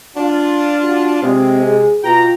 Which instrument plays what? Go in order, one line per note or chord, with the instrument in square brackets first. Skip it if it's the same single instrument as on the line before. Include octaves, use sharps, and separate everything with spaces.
[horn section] D4 F4
[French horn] F#4
[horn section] C3 G#3 [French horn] C4
[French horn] G#4
[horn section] B2 G5 A#5 [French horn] F4